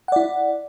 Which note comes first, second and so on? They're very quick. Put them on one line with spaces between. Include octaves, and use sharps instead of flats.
F#5 D5 E4